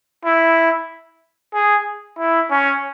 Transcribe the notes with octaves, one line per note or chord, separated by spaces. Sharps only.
E4
G#4
E4
C#4